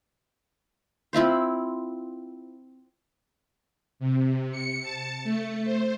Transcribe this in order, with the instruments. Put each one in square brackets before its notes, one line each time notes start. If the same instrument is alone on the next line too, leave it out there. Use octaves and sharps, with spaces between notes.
[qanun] C4 E4 F4 C5
[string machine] C3
C#7
A5
A3
C5